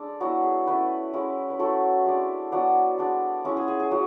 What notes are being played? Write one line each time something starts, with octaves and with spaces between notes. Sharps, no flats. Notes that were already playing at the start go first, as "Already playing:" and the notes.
Already playing: G#3 D4 A4
F#3 B3 E4 F#4
G#4
A3 C#4 E4 B4
G#3 C#4 E4
B4
F#3 A3 E4 A4
G#3 D4
F#3 B3 D4
G#3 D4
G#3 C#4 E4
G#4
G#4
G#4
F#3